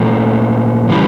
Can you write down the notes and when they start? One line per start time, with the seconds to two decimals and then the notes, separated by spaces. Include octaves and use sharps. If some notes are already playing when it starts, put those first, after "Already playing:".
Already playing: A#2 F3 A3
0.89 C#3 E3 G3